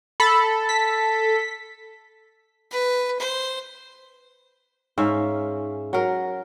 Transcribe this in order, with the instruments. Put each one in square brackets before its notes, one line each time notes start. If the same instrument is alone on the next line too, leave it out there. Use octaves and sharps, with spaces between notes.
[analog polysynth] A4 [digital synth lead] B5
[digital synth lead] B6
[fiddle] B4
C5
[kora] G#2 C#4 E5 F5
F#3 A#4